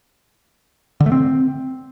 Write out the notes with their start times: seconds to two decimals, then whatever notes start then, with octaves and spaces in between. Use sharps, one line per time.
1.00 D3
1.06 A3
1.12 C4